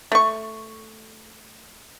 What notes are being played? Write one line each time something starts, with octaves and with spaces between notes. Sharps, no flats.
A3 C#6